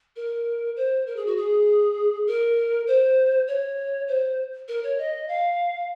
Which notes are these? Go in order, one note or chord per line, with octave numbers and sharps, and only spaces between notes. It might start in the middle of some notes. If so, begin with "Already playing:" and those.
A#4
C5
A#4
G#4
F#4
G#4
A#4
C5
C#5
C5
A#4
C#5
D#5
F5